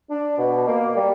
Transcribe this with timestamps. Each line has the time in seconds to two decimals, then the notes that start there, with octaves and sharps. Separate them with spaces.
0.10 D4
0.38 B2
0.67 A#3
0.96 G3